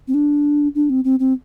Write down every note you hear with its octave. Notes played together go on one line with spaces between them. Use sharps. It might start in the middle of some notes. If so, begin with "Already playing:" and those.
C4
D4
D4
C4
C4
C4